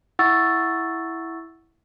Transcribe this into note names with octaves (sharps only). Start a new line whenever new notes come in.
E4 F#5 C#6 E6 A6